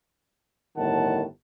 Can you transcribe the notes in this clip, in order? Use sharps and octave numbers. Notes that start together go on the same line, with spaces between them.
G1 A2 D#3 F#5 A5